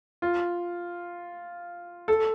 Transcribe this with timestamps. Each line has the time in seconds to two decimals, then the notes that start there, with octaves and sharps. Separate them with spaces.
0.22 F4
2.08 A4